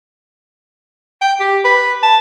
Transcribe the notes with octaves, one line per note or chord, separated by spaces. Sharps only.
G5
G4
B4
A5